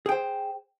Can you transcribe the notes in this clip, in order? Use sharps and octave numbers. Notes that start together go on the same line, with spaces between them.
G#4 C5 G5